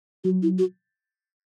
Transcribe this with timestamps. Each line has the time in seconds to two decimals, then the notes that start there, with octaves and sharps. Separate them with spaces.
0.24 F#3 F#4
0.42 E4
0.58 F#4